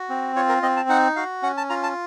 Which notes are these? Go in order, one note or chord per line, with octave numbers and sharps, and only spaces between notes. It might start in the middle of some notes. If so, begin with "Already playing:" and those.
Already playing: F#4
C4
F4 C#5
A#4
C4 D#5
A5
D#4 F#5
F#4 F5
C#4 F#5
A5
F4 A#5
A5